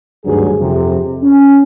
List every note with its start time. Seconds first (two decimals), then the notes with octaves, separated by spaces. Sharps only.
0.25 G#1 D2 G2 F#3 G#4
0.59 F2 C3
1.23 C#4